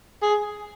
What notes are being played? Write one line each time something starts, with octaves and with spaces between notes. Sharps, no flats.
G#4